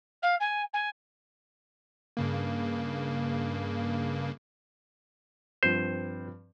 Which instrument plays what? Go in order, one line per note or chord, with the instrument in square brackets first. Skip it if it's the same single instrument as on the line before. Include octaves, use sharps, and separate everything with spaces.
[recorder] F5
G#5
G#5
[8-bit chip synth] G2 C#3 A#3
[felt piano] G2 F3 C4 [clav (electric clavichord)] C5